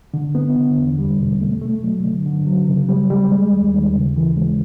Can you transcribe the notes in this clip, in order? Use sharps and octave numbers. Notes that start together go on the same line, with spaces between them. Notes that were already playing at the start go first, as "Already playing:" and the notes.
D3
B3
D3
E2
G3
B2
A3
A3
F#3
D3
D3
F#3
C#3
G3
G3
G#3
D#2
D#2
C#3
E3
G#3